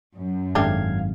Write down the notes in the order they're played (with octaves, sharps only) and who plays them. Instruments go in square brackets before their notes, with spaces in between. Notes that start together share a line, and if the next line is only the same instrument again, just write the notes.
[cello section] F#2
[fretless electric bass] G#1 [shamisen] A3 D4 G4 [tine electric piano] F5 G#6